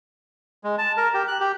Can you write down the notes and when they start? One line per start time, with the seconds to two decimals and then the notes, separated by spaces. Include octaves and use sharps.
0.64 G#3
0.78 A5
0.97 A#4
1.14 G4
1.28 F#6
1.40 G4